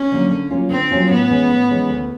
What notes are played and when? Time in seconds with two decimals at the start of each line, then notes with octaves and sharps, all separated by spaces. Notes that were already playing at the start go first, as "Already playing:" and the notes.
Already playing: C#4
0.12 D3 F#3 A#3
0.31 D3
0.50 F#3 A#3 C#4 F4
0.70 D3 C4
0.91 F#3 A#3 C#4 F4
1.10 A2 B3
1.29 E3 G#3 C#4
1.50 A2
1.70 E3 G#3 C#4
1.89 D2